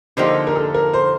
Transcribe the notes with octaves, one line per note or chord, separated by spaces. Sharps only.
D3 F3 A#3 D#4 G4 C5
A#4
A4
A#4
C5